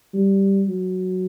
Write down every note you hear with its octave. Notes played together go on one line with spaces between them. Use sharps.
G3
F#3